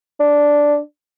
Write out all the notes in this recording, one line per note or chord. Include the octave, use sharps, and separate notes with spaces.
D4